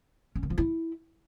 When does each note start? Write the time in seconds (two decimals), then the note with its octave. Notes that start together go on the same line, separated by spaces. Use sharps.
0.35 C#4
0.43 D#3
0.50 F3
0.58 E4